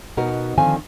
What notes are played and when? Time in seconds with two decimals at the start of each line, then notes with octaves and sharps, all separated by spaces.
0.17 B2 B3 D#4 F#4 A#4
0.57 D3 D#3 F3 C4 F5 G#5